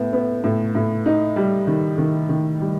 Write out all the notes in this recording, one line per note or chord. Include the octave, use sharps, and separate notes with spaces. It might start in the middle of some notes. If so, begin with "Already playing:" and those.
Already playing: A2 B3
B3
A2
A2
D#4
G3
D#3
D#3
D#3
G3